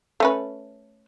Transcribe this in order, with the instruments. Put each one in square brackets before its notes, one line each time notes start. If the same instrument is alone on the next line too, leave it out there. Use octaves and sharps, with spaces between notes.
[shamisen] A3 C#4 B4